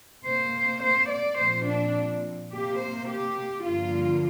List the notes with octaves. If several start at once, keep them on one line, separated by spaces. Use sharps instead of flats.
C3 A#3 C5
C5
D5
A#2 F3 C4 C5
D4
C3 A#3 G4
C5
G4
G2 D3 F3 A#3 F4